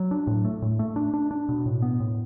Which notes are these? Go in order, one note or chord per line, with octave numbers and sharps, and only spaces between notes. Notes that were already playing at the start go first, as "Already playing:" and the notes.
Already playing: F#3
D4
A2
A3
A2
A3
D4
D4
D4
B2
A2
B3
A2